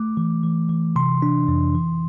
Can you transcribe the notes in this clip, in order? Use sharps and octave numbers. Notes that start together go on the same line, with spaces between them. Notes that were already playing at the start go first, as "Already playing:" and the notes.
Already playing: A3 D6
E3
E3
E3
C3 C6
D4
F2
E3